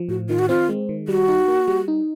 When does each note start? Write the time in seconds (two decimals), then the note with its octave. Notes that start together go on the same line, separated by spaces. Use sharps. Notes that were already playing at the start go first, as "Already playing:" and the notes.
Already playing: F3
0.09 A2 F#4
0.29 D#3 F4
0.39 F#4
0.49 C4 F4
0.69 G#3
0.89 D#3
1.08 G3 F#4
1.28 D#4
1.48 A#3
1.68 G3
1.88 D#4